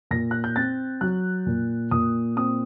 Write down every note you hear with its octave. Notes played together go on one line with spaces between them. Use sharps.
A#2 A#6
F#6
G6
C4 A6
F#3 F#6
A#2
A#2 D#6
C4 D#6